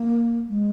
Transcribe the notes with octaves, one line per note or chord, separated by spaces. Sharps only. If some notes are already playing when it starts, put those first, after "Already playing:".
Already playing: A#3
G#3